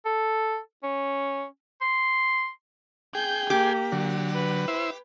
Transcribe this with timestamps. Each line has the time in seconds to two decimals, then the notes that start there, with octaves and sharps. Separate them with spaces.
0.06 A4
0.83 C#4
1.81 C6
3.15 G#4 G5 G6
3.50 A#3 G4
3.92 D3 F#3
4.35 B4
4.68 E4 C5 E5